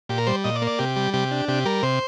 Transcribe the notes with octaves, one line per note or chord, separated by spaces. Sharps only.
A#2 G4
A#4
G3 C5
A#2 D#5
D5
A#3
D5
C3 G4
G3
C3 G4
D4
C3 G4
G3 A#4
C3 C5